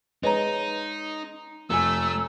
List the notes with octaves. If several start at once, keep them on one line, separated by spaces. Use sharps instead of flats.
G#3 D#4 B4 C#5 A#5
F1 A3 G#5 E6